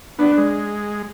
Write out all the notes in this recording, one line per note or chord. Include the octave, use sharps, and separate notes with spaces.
B3 D4
G#3